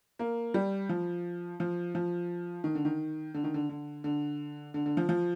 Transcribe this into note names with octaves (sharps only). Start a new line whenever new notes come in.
A#3
G3
F3
F3
F3
D#3
D3
D#3
D3
D#3
D3
D3
D3
D3
D3
F3
F3